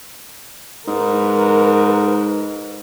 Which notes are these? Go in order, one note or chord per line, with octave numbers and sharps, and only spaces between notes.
G#2 A#4 B4